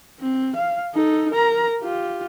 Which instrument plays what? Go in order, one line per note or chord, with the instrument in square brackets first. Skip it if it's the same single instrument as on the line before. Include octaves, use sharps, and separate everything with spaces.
[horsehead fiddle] C4
F5
D#4 A4
A#4 A#5
F4 G4